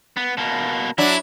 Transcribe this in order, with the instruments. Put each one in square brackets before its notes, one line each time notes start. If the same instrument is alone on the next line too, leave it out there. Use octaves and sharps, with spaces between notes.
[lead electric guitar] B3
B2 A#3
[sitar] F#3 D4 [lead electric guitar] E4